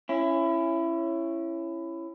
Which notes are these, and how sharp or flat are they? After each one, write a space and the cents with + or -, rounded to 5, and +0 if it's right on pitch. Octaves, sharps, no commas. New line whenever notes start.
C#4 -15 E4 +20